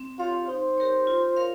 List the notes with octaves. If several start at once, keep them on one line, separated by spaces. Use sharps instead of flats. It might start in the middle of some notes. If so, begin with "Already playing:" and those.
Already playing: C4
F4 G4 C#5 F5
D#4 C5
G4 A#4 C#5
F4
A#4 C#5 F5